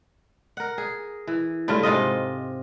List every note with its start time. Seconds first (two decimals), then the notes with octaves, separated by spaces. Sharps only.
0.57 A#4 F#5
0.78 G#4
1.27 E3
1.68 G2 C#3 A3 F4
1.83 G#2 C3 F4 D#5